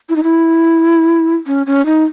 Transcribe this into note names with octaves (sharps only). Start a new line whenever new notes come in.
E4
D#4
E4
C#4
C#4
D#4